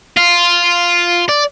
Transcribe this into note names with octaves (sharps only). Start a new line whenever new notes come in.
F4
D5